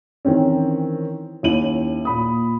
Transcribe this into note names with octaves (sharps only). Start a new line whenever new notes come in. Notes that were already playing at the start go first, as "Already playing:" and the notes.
D#3 E3 C4 C#4
D#2 C#4 E4 D#7 F#7
A#2 B5 D#6